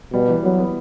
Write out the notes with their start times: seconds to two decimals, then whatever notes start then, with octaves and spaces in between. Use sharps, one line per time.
0.13 B2 G3
0.28 E3
0.44 F#3 B3
0.58 B3